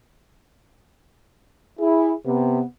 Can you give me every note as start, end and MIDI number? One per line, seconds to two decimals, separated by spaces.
1.80 2.12 64
1.80 2.12 68
2.26 2.62 48
2.26 2.62 59